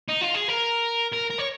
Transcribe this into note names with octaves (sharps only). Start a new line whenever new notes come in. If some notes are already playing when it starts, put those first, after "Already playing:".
D#4
F4
G#4
A#4
A#4
A#4
C#5